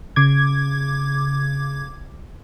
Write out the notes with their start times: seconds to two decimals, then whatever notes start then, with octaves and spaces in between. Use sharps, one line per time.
0.16 C#3 D6 G#6